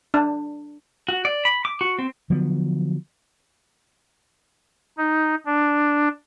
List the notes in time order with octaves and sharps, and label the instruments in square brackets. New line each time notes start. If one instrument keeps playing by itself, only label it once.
[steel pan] D4
[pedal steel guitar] F#4
D5
B5
D6
F#4
C4
[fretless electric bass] D3 F3 F#3 B3
[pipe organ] D#4
D4